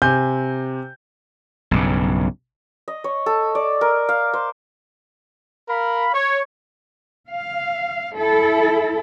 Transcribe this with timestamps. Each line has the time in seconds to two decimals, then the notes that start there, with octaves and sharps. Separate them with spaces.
0.02 C3 G#5 G6
1.71 B1 G2 C#3
2.88 D#5
3.04 C#5
3.26 A4
3.55 D5
3.81 A#4
4.09 F5
4.34 C5
5.69 A#4 F5 B5
6.14 C#5
7.29 F5
8.16 E4 A4